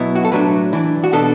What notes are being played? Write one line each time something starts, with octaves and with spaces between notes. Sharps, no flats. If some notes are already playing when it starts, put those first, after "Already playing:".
Already playing: B2 F#3 B3 E4
F#4
A4
A2 F#3 D4 B4
E3 D4
F#4
B2 B3 D4 A4